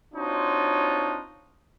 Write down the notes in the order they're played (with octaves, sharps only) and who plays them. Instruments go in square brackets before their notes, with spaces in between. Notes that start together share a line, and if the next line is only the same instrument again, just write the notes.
[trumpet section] C4 D4 D#4 F4 F#4 C#5